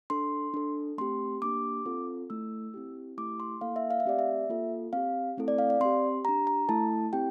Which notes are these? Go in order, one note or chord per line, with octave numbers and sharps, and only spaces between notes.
D4 A4 C6
D4 A4
A3 C4 G4 C6
A#3 D4 G4 D6
C4 F4 A4
A3 E4 A4 E6
C4 E4 G4
A3 E4 G4 D6
C6
A#3 E4 A4 F5
E5
F5
E5
A3 C4 G4 D5
E5
A#3 F4 A4
C4 G4 F5
A3 C4 E4 A4
D5
F5
D5
C4 G4 C6
D4 G4 A#5
A#5
A3 E4 A4 A5
C4 E4 G4 G5